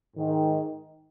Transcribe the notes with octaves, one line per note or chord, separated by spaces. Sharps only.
G#2 D#3